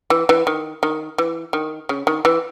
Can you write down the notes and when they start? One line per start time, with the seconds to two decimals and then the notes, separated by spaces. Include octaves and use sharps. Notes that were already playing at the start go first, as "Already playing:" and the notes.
0.10 E3
0.29 E3
0.47 D#3
0.83 D#3
1.18 E3
1.53 D#3
1.89 C#3
2.07 D#3
2.25 E3